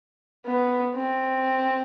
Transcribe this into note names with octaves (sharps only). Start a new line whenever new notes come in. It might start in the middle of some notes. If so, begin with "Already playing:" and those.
B3
C4